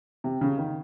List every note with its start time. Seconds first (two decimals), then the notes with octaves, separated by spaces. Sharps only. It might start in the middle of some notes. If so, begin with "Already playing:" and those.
0.24 C3
0.41 C#3
0.58 D#3